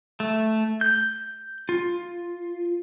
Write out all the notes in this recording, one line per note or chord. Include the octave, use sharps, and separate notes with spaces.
A3
G6
F4